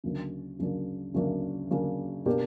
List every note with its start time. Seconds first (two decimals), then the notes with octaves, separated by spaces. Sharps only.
0.04 D2 C#3 F#3 A#3 D4
0.59 D2 C#3 F#3 A#3 D4
1.14 D2 C#3 F#3 A#3 D4
1.71 D2 C#3 F#3 A#3 D4
2.26 B2 A#3 D4 G4